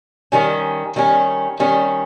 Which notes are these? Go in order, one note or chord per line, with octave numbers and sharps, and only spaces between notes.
D#3 G3 C#4
D#3 G3 C#4
D#3 G3 C#4